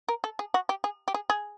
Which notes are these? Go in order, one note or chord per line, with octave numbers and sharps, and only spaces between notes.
A#4
A4
G#4
F#4
G4
G#4
G4
G#4
G#4